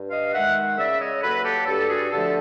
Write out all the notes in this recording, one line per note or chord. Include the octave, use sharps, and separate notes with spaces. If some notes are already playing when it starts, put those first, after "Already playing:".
Already playing: G2
D#5 F5
D#3 G#3 E5 F#5
C#3 D5 E5
C#5 D#5
F#3 A#3 A4 B4
G4 A4
G2 G4 A4
F#4 G#4
D3 F3 A3 G4 A4